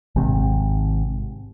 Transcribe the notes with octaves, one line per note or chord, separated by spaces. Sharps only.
G#1 G#2 C3